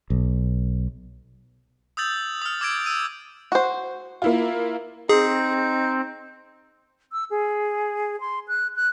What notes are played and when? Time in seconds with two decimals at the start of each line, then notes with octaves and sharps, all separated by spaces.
0.10 B1
1.97 D#6 E6 G6 A6 F#7
2.42 D#6 F6
2.61 D6 E6 G#6 A6 D7
2.86 E6 D#7
3.52 F#4 C5
4.22 A#3 E4 F4
5.09 C4 D#4 G#4
7.12 E6
7.31 G#4
8.21 C6
8.48 F#6
8.76 F#6